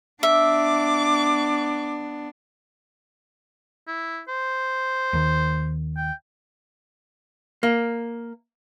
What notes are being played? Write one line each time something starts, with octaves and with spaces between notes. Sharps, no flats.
B3 D4 E5 D6
E4
C5
D#2 D#3
G5
A#3